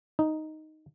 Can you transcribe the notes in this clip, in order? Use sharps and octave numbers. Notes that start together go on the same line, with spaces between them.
D#4